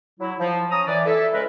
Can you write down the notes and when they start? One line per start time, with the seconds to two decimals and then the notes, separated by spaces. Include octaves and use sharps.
0.20 F#3 E4
0.40 F3
0.71 C#4 A#5 D#6
0.87 E3 D5
1.06 E4 A4 E5
1.34 C#3 E3 G#3 A#4 B4